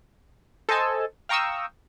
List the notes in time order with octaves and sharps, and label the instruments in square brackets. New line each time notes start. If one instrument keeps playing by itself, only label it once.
[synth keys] A4 C5 D#5 G#5 A5
F5 G5 A#5 C#6 D#6 E6